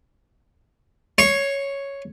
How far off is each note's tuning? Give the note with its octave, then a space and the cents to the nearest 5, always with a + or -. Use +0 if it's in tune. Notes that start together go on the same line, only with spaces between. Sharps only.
C#5 +0 C6 +40